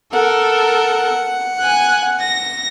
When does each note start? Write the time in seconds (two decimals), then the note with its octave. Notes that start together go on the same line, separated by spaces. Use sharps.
0.13 A4 A#4 F#5
1.59 G#5 F#6
2.20 A#6